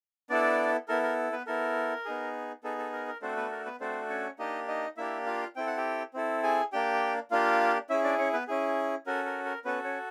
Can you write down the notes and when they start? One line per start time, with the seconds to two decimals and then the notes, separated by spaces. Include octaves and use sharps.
0.30 B3 D4 E4 A4 D5
0.88 B3 E4 A4 A#4
1.03 A#4
1.32 B3 B4
1.47 B3 E4 A4 A#4
2.05 B3 D#4 G#4
2.63 B3 D#4 G#4 A4
2.78 A4
2.93 A#4
3.07 A#4
3.22 A3 C4 D4 F#4 A4 C5
3.37 B3 B4
3.51 A#4
3.66 B3 B4
3.80 A3 C4 D4 F#4 A4 C5
4.10 C#4 C#5
4.39 A#3 D4 D#4 G4 D#5
4.68 D#4 D#5
4.97 A#3 D4 E4 G4 E5
5.26 F4 F5
5.56 C4 E4 A4 G5
5.67 F#5
5.77 G4 G5
6.14 C4 E4 A4
6.43 G#4 G#5
6.73 A#3 D4 G4 G5
7.31 A#3 D4 F4 G4 F5
7.90 C#4 E4 G#4 E5
8.04 D4 D5
8.18 C#4 C#5
8.33 B3 B4
8.48 C#4 E4 G#4
9.07 C#4 F#4 A4 A#4
9.26 A#4
9.45 A#4
9.65 B3 C#4 F#4 A4 B4
9.84 C#4 C#5